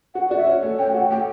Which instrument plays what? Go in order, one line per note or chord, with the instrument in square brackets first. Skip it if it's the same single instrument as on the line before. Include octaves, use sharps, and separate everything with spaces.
[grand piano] F#4 [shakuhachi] F#5
[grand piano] F#4 [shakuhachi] D5
[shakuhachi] E5
[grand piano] C#4
A3
[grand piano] C#4 [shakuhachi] G5
[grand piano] F#4 [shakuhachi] F#5
[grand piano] A3 [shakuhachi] G5